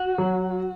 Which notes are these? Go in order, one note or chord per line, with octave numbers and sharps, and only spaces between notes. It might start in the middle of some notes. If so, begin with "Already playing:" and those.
Already playing: F#4
F#3